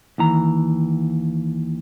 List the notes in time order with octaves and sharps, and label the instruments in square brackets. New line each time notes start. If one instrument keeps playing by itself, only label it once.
[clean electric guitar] D#2 E3 A#5